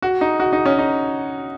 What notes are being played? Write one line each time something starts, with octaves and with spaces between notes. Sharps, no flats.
F#4
D#4
F#4
D#4
C#4
D#4